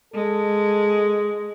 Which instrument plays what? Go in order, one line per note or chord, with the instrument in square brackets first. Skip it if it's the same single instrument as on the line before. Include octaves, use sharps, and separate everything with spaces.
[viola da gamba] G#3 [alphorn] A4